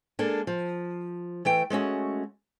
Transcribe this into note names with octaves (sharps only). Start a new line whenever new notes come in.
G#3 A#3 D4 A4
F3
E3 A3 G5
G#3 A3 C#4 F#4